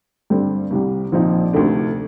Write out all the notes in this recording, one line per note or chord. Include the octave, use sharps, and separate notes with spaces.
G2 D3 G3 C4
C2 C3 G3
A#1 A#2 F3 C4 D#4
D2 C3 D#3 A3 D4